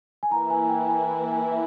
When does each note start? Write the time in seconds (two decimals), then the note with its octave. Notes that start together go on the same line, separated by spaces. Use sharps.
0.23 G#5
0.31 E3 A#3 E4 A#5
0.50 G#5
0.63 G#5
0.69 G5
0.88 G#5
1.07 G#5
1.32 G#5
1.51 E5